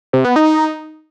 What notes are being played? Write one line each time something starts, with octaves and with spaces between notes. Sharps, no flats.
C3
B3
D#4